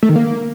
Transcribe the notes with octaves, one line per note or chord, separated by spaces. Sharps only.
A3
D#3
A#3